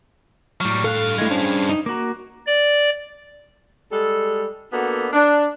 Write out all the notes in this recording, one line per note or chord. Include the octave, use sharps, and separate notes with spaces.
A2 F#3 G3 C#6 F6
G2 A4 F5 F#6
G#3 A3 E4 G#6
C#4 D4 G#4 C5
D#4
A#3 F#4 A#5 D6
D5
G3 G#3 A4
A#3 B3 D4 F#4 A4
D4